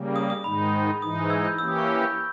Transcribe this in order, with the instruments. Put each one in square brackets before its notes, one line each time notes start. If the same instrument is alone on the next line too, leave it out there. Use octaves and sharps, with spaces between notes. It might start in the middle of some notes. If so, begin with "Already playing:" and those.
Already playing: [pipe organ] C#3 G3 A#3
[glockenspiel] D#6
D#6
[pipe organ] G#2 D#3 G#3 D#4 [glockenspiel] B5
[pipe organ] G#2 E3 G#3 D#4 [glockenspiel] D#6
[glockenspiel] E6 G#6
G6
[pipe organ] E3 A#3 C#4 G4 [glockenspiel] E6
[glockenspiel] D#6
C#6
E6
G6